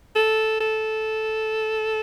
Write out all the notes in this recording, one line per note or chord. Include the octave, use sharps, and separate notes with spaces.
A4
A4